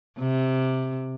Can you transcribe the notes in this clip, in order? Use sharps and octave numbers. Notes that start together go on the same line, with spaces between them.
C3